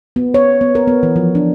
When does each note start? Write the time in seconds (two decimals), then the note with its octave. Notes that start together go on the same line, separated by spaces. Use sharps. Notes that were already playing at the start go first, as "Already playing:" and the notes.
0.16 B3
0.34 C#5
0.61 B3
0.75 A#4
0.88 B3
1.03 E3
1.16 F3
1.35 D4